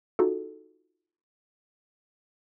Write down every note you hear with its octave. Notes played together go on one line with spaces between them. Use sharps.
D#4 F4 F#4 G#4 A4